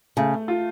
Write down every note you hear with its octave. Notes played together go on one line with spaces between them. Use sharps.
C#3 A3
F4